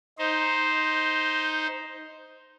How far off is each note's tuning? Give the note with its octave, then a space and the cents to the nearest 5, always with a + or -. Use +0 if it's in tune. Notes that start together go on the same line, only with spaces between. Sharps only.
D#4 +5 C5 +0